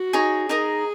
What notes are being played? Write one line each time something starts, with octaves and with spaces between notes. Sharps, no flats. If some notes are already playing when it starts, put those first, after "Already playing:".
Already playing: F#4
D#4 G#4 C#5
D#4 G#4 A#4 D#5 A#5